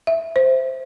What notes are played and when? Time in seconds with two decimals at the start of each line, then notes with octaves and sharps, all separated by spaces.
0.07 E5
0.36 C5